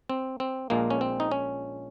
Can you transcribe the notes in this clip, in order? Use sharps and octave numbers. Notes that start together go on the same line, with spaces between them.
C4
C4
A#1 A#2 G#3 A#3
C#4
C4
D#4
C#4